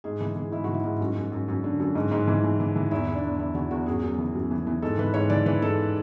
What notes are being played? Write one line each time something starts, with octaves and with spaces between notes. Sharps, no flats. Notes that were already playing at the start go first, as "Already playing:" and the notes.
G#2 G#4
E3
E3 G#4
G#2 E4
E3 F#4
E4
G#2
F#2
F#2
F#2
F#2
D3
F#2
G#2
G#2
E3
E3
E3
E3
E2 E4
E2
D4
E2
E3 E4
E3 F#4
E2 F#4
F#2 G#4
F#2
E3
F#2
E3
E3
G#2 A4
E3 B4
G#2 C#5
E3 D5
E3 B4
G#2 A4